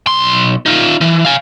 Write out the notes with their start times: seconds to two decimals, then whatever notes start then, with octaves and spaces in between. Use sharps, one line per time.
0.07 B1 C6
0.66 D#4 F4
1.01 E3
1.25 F5 G#5